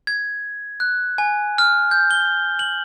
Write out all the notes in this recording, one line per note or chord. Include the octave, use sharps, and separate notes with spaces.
G#6
F#6
G#5
F6
G6
G7
F#7